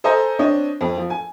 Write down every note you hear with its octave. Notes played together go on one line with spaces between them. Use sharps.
A4 C5 D#5 G#5 A#5
C4 D4 C#5 D#5
F2
F3
G#5